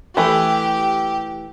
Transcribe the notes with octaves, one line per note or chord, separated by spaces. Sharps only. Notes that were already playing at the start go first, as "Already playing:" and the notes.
E3 A3 G4